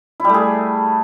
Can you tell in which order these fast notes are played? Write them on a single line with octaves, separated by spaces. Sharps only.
E4 G3 A3 G#4